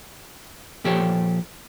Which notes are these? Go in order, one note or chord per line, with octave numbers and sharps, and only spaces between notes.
A#2 F3 G4 A4 C#5